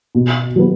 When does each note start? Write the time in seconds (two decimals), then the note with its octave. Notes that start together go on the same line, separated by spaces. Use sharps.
0.15 B2
0.56 F#3 B3